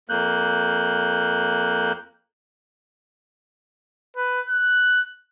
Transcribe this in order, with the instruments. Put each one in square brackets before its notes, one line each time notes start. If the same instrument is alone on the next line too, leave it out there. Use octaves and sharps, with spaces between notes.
[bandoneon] F2 A#3 F#6 G6
[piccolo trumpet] B4
F#6